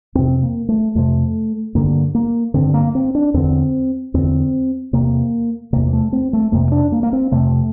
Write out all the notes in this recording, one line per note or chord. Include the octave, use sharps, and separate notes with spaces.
F2 C3 C4
A#3
A3
F2 C3 A3
G2 D3 A#3
A#3
G2 D3 C4
A#3
C4
D4
E2 D3 C4
E2 D3 C4
E2 C3 A#3
E2 C3 A#3
A3
C4
A3
F2 C3 A#3
D4
A#3
A#3
C4
F2 C3 A3